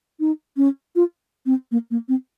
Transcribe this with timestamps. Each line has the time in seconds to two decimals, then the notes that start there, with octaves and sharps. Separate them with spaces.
0.20 D#4
0.57 C#4
0.96 F4
1.46 C4
1.72 A#3
1.91 A#3
2.09 C4